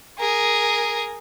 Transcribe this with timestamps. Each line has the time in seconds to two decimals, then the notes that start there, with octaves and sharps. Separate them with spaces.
0.19 G#4 A#4